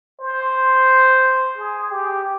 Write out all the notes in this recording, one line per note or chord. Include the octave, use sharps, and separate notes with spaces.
C5
G#4
G4